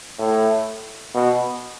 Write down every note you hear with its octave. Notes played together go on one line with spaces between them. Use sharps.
A2
B2